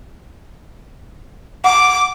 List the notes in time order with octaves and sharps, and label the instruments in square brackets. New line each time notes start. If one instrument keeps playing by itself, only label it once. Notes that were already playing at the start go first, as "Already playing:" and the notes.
[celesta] F#5 [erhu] D6